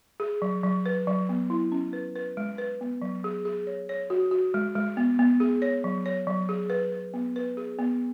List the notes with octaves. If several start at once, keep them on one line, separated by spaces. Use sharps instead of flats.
G#4
F#3
F#3
B4
F#3
B3
E4
C#4
B4
B4
G#3
B4
B3
F#3
G#4
G#4
C#5
C#5
F#4
F#4
G#3
G#3
B3
B3
G#4
C#5
F#3
C#5
F#3
G#4
B4
B4
B3
B4
G#4
B3